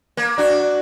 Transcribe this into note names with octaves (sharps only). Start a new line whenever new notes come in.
A#3
D4 F#4